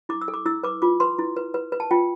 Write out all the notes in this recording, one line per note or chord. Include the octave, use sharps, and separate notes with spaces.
E4 D6
E6
A4
D6
E4 E6
B4 D6
F4 D6
B4 C6
E4
B4
B4
B4
A5
F4 G5